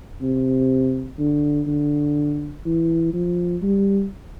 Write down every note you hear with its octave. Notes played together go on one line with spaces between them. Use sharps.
C3
D3
D3
E3
F3
G3